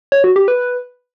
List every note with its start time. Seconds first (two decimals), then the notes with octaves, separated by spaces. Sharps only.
0.12 C#5
0.24 F#4
0.36 G4
0.48 B4